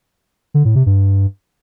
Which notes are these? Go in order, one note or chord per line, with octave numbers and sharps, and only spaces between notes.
D3
A2
C3
G2